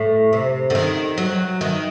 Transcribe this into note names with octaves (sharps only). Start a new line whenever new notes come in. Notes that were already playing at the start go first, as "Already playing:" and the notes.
Already playing: A2
C3
D3
D#3
F#3
D#3